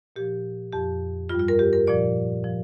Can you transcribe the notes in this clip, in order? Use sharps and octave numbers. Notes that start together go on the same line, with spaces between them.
A#2 F3 G4
F2 F3 G4
G2 G3 F4
F4
A#4
G4
A#4
A#2 F3 D5
F3